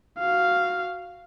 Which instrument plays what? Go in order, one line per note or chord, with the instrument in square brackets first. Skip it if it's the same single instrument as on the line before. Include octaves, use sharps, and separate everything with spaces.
[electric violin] F#4 F5